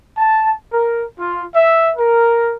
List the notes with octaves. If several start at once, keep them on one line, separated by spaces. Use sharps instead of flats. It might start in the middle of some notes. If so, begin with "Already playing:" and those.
A5
A#4
F4
E5
A#4